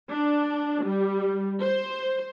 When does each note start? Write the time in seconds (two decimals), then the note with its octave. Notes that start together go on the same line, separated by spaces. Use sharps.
0.11 D4
0.86 G3
1.62 C5